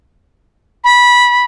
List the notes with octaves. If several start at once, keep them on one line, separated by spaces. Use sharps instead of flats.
B5